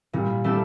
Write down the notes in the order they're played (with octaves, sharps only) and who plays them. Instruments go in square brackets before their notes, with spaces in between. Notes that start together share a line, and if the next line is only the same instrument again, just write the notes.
[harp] A#2 [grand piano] G3
[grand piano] G3 [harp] A3 D4 A4